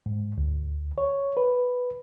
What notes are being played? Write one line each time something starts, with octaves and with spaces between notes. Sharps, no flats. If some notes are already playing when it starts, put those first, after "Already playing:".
G#2
D2
C#5
B4